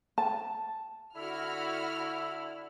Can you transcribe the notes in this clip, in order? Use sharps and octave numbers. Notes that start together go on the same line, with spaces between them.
A5
D3 E4 F#4 B5 F6